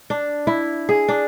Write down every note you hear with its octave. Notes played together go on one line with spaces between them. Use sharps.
D4
E4
G#4
D4